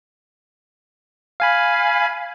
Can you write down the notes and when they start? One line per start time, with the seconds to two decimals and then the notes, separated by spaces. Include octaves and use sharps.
1.40 F5 G#5 B5